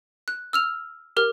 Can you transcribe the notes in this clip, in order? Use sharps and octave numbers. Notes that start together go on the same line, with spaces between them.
F#6
E6 F6 F7
G4 A#4 F6